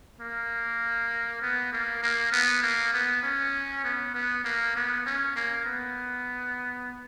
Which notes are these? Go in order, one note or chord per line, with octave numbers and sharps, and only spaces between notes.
A#3
B3
A#3
A#3
B3
A#3
B3
C#4
B3
B3
A#3
B3
C#4
A#3
B3